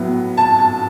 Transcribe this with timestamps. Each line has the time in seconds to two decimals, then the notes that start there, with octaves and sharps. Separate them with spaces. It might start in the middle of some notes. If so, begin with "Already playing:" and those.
Already playing: A2 F#3 B3
0.37 A5
0.59 A5